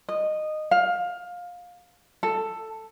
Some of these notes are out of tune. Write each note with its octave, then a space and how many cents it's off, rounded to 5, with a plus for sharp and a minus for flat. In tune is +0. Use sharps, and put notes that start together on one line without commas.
D#5 -15
F5 +20
A4 +10